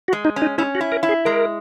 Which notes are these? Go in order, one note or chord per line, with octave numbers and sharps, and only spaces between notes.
F#4
G#3
D#4
C#4
D#4
C#4 E4
F#4
E4
A#4
E4
G#4
G#3 A#4